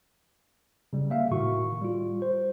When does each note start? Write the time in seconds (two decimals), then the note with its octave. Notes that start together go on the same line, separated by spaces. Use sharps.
0.93 C#3 G3
1.10 A#3 E5 F5
1.31 A2 D#3 F#4 C#6
1.81 G3 F4
2.22 C5